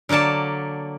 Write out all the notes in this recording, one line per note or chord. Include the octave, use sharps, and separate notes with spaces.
D3 F#3 A#3 D5 A5